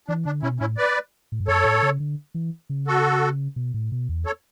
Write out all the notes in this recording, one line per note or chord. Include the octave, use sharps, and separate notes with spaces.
E3 D4
D3 D4
B2 C#4 E4
A2 C#4 E4
B4 D5
A2
G2
F#2 A4 C#5
A2
C#3
D3
E3
C#3
F#4 A4
B2
A2
B2
E2
A4 C#5